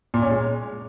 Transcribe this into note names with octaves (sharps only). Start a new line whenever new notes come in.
A#2
C#4
G#3